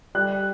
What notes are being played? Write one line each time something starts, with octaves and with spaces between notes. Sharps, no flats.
G3 F#6